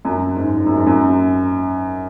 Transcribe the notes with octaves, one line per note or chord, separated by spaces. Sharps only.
F#2
G#2
G#2
F#2
G#2
F#2